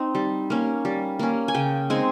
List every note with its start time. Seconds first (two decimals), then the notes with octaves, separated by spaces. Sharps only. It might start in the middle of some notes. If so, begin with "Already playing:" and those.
Already playing: C4 D#4
0.15 G3
0.50 A#3 C#4
0.85 G3
1.19 A#3 C#4
1.48 G#5
1.54 C#3 G5
1.90 G#3 C4 D#4 G#5